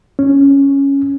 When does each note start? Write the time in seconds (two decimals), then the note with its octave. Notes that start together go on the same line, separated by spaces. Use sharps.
0.19 C#4